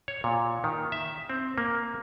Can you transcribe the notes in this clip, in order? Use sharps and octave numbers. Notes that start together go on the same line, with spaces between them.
C#5
A#2
D#3
E5
C4
A#3